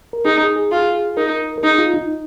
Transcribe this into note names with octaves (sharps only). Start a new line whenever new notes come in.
A#4
D#4 G#4
G#4
G#4
F4 G#4
D#4 A#4
A#4
D#4 G#4
F4
D#4